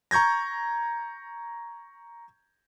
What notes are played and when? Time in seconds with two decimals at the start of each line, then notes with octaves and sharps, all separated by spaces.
0.11 A#5 C#6 G6 G#6 A#6